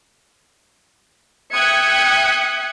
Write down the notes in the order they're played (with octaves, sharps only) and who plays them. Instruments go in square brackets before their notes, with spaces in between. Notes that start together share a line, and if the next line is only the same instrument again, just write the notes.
[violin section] E5 G5 D#6 F#6 G#6 C#7